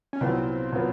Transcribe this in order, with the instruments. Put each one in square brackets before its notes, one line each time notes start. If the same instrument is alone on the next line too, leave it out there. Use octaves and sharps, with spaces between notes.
[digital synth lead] C#4
[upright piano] C2 A#2 F#3 B3 [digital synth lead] C4
[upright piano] A#2 F#3 B3